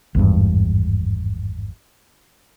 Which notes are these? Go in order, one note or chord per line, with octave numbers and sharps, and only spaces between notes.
G#1 E2 G2